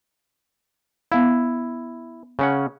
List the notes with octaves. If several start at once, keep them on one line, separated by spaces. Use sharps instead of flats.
B3 E4 F5
C#3 C#4 F#5